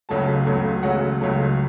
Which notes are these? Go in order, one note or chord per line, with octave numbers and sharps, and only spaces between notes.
C#2 C#3 F#3 A3 A5
C#2 C#3 F#3 A3
C#2 C#3 F#3 A3 F#5
C#2 C#3 F#3 A3